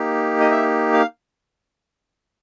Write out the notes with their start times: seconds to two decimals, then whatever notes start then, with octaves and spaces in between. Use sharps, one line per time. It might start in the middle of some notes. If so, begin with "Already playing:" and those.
Already playing: A#3 D#4 G4
0.41 D#5
0.51 E5
0.93 F5